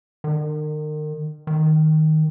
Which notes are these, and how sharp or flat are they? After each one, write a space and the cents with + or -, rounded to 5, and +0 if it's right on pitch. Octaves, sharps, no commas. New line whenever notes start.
D#3 -35
D#3 +5